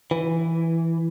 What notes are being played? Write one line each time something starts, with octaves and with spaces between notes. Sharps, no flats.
E3